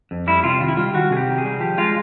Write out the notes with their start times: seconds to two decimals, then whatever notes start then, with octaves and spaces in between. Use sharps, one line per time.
0.11 F2
0.27 G3 E4
0.44 C3 F4
0.60 D#3 F4
0.69 E4
0.77 G3 F4
0.94 D#3 F#4
1.10 C3 G#4
1.17 G4
1.28 D#3
1.38 G#4
1.45 G3
1.60 F3 G4
1.77 G#3 F4